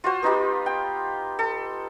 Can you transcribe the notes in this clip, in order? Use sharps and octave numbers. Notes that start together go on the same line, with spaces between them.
F4 F#4 C5
B3 D#4 F4 G4
G5
A4